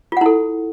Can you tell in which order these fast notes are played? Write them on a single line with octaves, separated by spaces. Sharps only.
F4 F#5 E4 A4